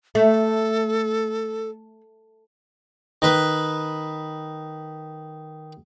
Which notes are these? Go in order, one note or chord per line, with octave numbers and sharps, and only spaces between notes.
A3 A4
D#3 B4